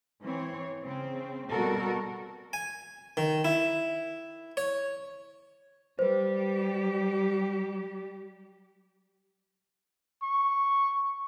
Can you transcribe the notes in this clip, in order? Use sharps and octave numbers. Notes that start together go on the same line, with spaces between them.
E3 C4 C#5
C#3 C4
B2 G3 F#4 A4 A#4
G#5
D#3
E4
C#5
G3 G4 B4 C5
C#6